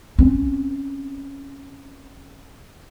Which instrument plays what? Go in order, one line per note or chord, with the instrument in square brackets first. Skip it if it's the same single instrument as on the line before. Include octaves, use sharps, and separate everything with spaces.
[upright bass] C4 C#4